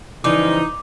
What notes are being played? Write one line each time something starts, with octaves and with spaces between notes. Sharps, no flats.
C#3 E3 F3 G3 D#4 D6